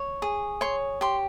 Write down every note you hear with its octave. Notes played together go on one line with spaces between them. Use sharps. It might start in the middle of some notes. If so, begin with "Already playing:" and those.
Already playing: C#5
G#4
C#5 C6
G4 C6